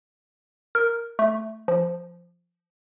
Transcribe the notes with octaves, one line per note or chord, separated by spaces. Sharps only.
A#4
A3
F3